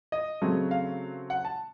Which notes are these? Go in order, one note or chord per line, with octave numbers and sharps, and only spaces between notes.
D#5
C#3 F#3 A3 C4
F5
F#5
A5